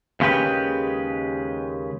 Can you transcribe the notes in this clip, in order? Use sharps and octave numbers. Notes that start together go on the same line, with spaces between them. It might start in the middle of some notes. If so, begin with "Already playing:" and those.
D#2 C#3 G#3 G4 B4